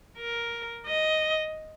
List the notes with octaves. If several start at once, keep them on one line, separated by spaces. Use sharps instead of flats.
A#4
D#5